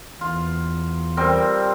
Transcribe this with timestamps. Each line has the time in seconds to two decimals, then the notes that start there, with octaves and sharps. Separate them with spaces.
0.21 E2 F4
1.17 G3 C4 A#4